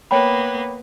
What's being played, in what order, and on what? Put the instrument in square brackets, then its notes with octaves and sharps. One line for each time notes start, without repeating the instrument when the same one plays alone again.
[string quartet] A#3 B3 [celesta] C#5 G5 B5